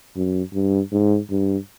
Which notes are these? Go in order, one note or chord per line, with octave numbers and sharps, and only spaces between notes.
F#2
G2
G#2
G2